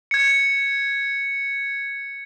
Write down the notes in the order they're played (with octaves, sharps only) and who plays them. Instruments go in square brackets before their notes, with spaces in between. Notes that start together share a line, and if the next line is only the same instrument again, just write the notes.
[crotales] G#6 C#7